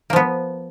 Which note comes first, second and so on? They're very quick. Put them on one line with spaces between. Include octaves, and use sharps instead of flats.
A#3 F3 B3